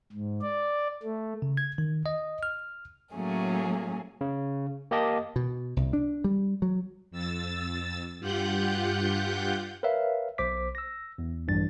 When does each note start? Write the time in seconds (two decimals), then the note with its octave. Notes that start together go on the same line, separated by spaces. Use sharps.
0.12 G#2
0.42 D5
1.03 A3
1.42 C#3
1.57 G#6
1.78 D#3
2.06 D#5
2.43 F6
3.15 A2 F#3 A3 A#3 C#4 G#4
4.21 C#3
4.91 A#3 G4 D#5 A5
5.36 B2
5.77 C2
5.93 D4
6.24 G3
6.62 F#3
7.11 F2 E6 A6
8.19 G2 F4 G4 F#5 F#6 G6
9.83 A#4 B4 C#5 E5 F5
10.38 B1 C5 D6 B6
10.75 E6 A#6
11.18 E2
11.48 A#1 G2 E3 A6